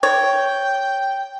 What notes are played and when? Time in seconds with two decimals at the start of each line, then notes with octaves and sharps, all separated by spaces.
0.03 C#5 G5